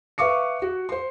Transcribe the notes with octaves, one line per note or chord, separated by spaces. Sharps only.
B4 E5 F5 C#6 D6 C#7
F#4
C5 C6